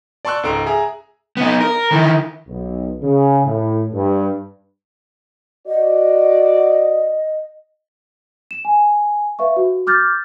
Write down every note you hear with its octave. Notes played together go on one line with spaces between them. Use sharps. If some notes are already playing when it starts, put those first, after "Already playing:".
D5 A5 C6 C#6 E6 F#6
C#2 G#2 A4 A#5 D7
G#4 E5 G#5 A#5
B3 D#4
A#4
D#3 E3
B1
C#3
A2
G2
F#4 D5 D#5
E7
G#5
B4 E5 F5 C#6
F#4
D6 F6 G6 A6